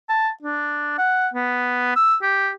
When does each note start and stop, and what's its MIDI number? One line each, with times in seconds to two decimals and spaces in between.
0.09 0.30 81
0.42 0.95 62
0.98 1.28 78
1.34 1.95 59
1.96 2.16 88
2.22 2.50 67